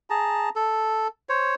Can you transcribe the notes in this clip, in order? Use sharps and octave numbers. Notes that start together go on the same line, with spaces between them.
G#4 A5 A#5
A4
C5 C#5